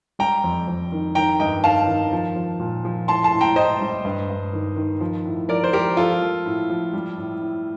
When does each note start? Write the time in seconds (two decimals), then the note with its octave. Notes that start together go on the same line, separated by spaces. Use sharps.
0.19 G3 G5 A#5
0.44 F2
0.68 F2
0.92 D#3
1.15 D#3 G5 A#5
1.39 G2 D#5 G5
1.64 D#3 F5 A5
1.87 D#3
2.12 F3
2.36 F3
2.60 A#2
2.85 F3
3.08 A2 A5 C6
3.24 A5 C6
3.32 A2
3.41 G5 A#5
3.56 A2 C5 D#5
3.81 G3
4.05 G2
4.29 G2
4.53 D#3
4.76 D#3
5.00 F3
5.25 A2
5.49 F3 A#4 D5
5.64 C5
5.73 F3 G4 A#4
5.97 F3 F4 A4
6.21 F3
6.45 A2
6.70 F3
6.93 G3
7.18 A2
7.41 A2